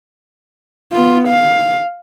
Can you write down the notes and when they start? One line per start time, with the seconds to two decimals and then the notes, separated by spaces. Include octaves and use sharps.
0.92 B3 F4
1.28 F5